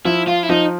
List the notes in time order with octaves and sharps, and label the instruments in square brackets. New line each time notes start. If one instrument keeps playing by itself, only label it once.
[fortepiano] F3 [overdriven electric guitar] E4
[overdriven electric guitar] F4
E4
[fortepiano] F3 [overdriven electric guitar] D#4